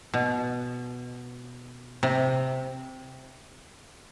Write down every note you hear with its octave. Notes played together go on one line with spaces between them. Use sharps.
B2
C3